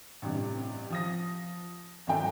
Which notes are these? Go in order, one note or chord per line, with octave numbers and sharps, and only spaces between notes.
A1 G2 C3
F3 D#6 A#6
G#1 F#2 F#3 A4 G5